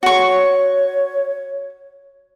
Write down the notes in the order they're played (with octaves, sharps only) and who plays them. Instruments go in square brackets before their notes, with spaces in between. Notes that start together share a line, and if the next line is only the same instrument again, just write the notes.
[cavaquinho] F#4 C#6 [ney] C#5